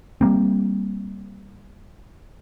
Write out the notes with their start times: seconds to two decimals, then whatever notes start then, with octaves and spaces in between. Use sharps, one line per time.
0.21 G3 G#3 A#3 C4